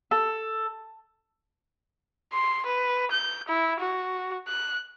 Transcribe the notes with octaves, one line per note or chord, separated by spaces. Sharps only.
A4
C6
B4
G6
E4
F#4
F#6